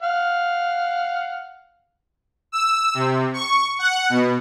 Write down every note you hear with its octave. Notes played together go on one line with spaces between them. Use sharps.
F5 F#5
E6
C3
C#6
F#5
B2